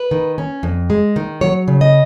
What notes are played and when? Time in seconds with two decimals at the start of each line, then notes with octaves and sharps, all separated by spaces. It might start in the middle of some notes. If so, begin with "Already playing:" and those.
Already playing: B4
0.11 D#3
0.38 C#4
0.63 F2
0.90 G#3
1.16 D#3
1.41 F#3 C#5
1.68 C#3
1.81 D#5